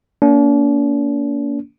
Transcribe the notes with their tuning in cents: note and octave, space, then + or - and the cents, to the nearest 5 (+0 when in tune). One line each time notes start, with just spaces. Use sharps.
A#3 +0 D4 -45